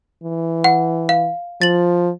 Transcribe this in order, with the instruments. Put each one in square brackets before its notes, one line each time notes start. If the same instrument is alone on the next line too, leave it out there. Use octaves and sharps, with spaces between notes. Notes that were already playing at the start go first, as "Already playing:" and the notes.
[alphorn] E3
[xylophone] F#5
F5
[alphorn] F3 [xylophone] A6 F#7